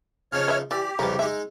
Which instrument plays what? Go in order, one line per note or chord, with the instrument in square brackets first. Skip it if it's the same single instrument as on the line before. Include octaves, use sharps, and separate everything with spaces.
[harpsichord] C#3 F3 D#4 [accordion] C#5 F6
[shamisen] B4 D#5 E5
[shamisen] E3 [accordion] G4 [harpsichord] D5
[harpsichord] C2 F2 C#3 [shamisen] A#4 B4
[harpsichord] G#3 D#4 [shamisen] E5